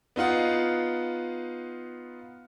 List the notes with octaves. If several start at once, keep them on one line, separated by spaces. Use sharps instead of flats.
B3 D#4 F4 F#5